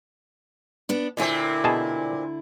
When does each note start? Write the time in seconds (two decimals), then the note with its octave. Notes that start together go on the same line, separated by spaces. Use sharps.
0.89 B3 D4
1.17 D2 A#2 D3 C4 E4
1.64 B2 G#4 A5